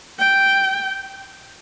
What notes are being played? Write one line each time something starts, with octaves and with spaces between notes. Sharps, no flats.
G5